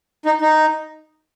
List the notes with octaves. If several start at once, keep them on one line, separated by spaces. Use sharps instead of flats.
D#4
D#4